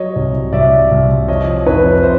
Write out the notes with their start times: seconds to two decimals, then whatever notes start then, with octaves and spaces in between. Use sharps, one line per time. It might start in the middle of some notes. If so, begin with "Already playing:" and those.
Already playing: F#3 C#5 D#5
0.16 C2
0.53 C2 D5 E5
0.91 C2
1.28 F3 C#5 D#5
1.66 F2 B4 C#5
2.03 C5